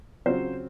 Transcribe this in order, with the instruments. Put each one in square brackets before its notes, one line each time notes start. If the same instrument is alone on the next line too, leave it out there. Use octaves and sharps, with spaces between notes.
[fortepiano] C#3 F#3 C4 F4 C5